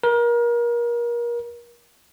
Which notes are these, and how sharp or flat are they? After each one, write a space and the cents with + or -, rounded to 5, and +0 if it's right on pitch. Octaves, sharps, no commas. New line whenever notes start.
A#4 +30